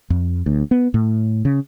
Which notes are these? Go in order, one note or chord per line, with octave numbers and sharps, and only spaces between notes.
F2
D2
B3
A2
C#3